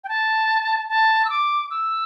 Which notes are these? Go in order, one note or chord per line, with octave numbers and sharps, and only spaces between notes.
G5
A5
A5
E6
D6
E6